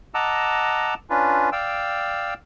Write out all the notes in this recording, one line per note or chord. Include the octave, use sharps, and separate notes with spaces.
D#5 F#5 A5 A#5 D6 E6
C#4 D4 F4 B4
D5 F5 G5 E6